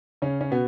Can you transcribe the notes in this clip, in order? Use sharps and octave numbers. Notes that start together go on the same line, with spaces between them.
C#3 C#4
C#4
B2 B3